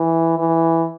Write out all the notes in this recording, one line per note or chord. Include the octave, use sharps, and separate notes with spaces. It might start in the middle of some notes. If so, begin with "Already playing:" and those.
Already playing: E3
E3